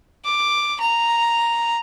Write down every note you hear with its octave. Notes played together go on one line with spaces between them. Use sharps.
D6
A#5